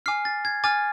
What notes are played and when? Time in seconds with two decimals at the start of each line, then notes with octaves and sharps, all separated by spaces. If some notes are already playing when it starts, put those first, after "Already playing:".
0.06 G#5 D6 F6 C7
0.25 A6
0.45 G#6
0.64 G#5 D6 F6 A6